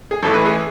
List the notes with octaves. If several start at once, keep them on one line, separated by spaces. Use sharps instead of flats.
G#4
A1 A2 E3 A4
B4
G#4